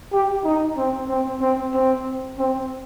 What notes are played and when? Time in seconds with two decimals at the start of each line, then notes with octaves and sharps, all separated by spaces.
0.13 G4
0.45 D#4
0.77 C4
1.09 C4
1.41 C4
1.74 C4
2.39 C4